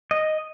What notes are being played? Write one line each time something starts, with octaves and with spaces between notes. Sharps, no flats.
D#5